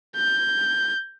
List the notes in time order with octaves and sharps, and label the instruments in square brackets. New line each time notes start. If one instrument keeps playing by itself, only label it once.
[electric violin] G6